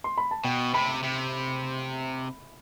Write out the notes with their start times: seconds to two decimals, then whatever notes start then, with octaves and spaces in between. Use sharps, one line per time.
0.04 C6
0.18 B5
0.31 A5
0.44 B2 G5
0.74 C3 B5
1.04 C3